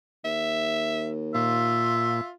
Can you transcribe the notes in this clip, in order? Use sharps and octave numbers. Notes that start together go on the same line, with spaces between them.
D#2 E5
A#2 F4 E5